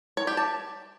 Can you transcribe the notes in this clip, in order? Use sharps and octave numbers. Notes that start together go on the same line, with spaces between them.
C#5
G4
A5